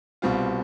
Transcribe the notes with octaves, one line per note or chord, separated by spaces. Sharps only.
C2 B2 G3 C4 F4